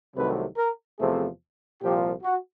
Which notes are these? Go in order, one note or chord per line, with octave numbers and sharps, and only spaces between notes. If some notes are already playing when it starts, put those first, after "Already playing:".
C2 C3 D#3 F#3 A3 B4
A#4
E2 C3 F3 A3 C4 G#4
C2 A#2 F3 G4
F#4